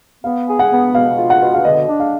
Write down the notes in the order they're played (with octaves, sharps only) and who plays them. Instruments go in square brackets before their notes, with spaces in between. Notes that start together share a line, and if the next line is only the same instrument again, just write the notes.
[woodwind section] B3 [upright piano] F5
[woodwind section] G#4
[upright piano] F#5
[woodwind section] B3
[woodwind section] B2 [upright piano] F5
[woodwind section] F4
[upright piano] F#5
[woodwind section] B2
[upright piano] F5
[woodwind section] D3 [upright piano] D#5
[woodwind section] D4
[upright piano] F5